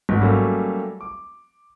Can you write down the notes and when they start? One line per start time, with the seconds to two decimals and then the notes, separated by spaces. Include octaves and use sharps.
0.09 G#1
0.21 F#3 G3 A3 A#3 C#4
1.01 D6